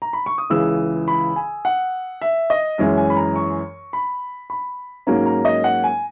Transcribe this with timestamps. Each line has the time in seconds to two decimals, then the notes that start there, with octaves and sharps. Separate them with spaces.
0.02 A#5
0.13 B5
0.26 C#6
0.38 D#6
0.50 C#2 C#3 E3 E6
1.08 B5
1.36 G#5
1.65 F#5
2.22 E5
2.50 D#5
2.78 F#2 E3 G#3 C#4 E5
2.97 G#5
3.10 B5
3.16 A#5
3.36 C#6
3.93 B5
4.50 B5
5.07 G#2 F#3 A#3 C#4 A#5
5.26 A#5
5.45 D#5
5.64 F#5
5.84 G#5